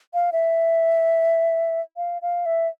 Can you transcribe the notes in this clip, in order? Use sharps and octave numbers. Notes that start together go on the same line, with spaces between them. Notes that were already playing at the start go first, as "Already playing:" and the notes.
F5
E5
F5
F5
E5